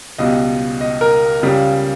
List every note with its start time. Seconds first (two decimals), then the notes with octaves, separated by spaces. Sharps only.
0.18 C#2 B2 G3 D#5
0.81 D#5
1.01 A#4
1.42 C#2 C#3 G3